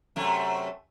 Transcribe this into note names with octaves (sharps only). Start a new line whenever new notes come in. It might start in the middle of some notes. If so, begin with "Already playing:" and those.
F#2 C3 A3